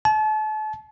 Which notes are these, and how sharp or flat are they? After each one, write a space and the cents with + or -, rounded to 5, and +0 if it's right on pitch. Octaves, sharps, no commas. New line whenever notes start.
A5 -35